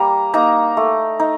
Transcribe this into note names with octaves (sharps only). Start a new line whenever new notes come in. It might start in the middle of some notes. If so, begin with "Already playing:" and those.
Already playing: G3 A#3 A#5
A#3 D#4 A#5
A3
D#4